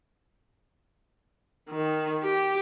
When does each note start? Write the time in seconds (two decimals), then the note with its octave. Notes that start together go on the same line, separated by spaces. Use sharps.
1.70 D#3
2.23 G4